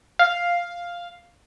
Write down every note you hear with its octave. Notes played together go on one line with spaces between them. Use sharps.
F5